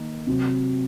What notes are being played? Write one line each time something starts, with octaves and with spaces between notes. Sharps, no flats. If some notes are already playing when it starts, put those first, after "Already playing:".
Already playing: D#3 A#3 D#4
C3 F#3 C4